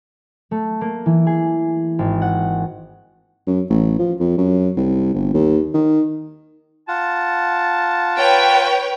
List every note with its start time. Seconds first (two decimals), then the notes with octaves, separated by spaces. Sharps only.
0.51 A3
0.81 A#3
1.06 E3
1.27 G#4
1.99 G#1
2.22 F#5
3.47 F#2
3.70 A1
3.99 F3
4.20 F2
4.38 F#2
4.77 C2
5.14 G1
5.34 D#2
5.74 D#3
6.88 F4 F#5 A5
8.17 B4 C#5 G5